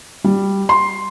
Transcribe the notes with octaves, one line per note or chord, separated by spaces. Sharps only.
G3
C6